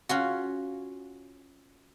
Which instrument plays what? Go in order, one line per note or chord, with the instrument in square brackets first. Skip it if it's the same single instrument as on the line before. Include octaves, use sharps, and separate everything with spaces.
[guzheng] C#4 F4 F#4